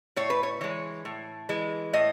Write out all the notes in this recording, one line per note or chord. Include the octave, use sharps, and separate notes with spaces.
A2 C#5
B4
C#5
E3 G#3 C#5
A2
E3 G#3
A2 D#5